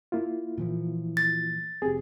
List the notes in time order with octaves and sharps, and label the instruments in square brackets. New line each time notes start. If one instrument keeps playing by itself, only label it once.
[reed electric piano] A#3 E4 F4
[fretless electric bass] A#2 E3 F3
[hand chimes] A6
[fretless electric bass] F1 C4 [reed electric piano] G4 G#4